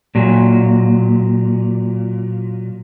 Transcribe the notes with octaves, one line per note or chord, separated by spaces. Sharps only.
A#2 F#3